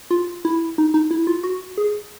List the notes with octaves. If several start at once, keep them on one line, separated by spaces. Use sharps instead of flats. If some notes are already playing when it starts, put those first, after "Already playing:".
F4
E4
D#4
D#4
E4
F4
F#4
G#4